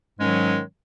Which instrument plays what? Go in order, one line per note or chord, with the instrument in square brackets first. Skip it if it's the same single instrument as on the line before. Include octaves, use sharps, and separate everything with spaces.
[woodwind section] G#2 D#3 F#3 G#3 C#4